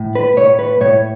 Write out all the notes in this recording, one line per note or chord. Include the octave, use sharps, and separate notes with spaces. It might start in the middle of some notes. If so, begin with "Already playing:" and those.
Already playing: A2
B4
A2 C#5
B4
A2 C#5